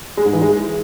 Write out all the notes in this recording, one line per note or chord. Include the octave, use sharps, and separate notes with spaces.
G#3
G#2
E3
G#3